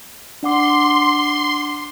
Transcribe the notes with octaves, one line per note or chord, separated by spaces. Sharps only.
D4 F#5 C6 D6